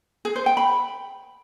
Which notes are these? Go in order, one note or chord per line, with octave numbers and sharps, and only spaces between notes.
G#4
C5
G5
B5